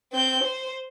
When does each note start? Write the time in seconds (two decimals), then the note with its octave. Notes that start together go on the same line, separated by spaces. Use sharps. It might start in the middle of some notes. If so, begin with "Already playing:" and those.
0.13 C4 G6
0.43 C5